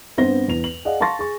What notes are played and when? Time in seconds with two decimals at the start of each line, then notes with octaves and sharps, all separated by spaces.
0.17 G2 B3 C4 C5 A#6 G7
0.48 E2 F7
0.64 F#7
0.85 G#4 D5 D#5 F5 F#5
1.00 F5 A5 C6 C#6 A6 A#6
1.19 G#4 C#6